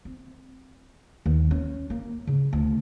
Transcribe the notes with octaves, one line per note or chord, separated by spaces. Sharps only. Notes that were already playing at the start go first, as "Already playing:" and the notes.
C4
D#2
C#4
A#3
C#3
D2